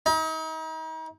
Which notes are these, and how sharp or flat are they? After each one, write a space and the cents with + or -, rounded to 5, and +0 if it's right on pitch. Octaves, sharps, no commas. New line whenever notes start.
D#4 +40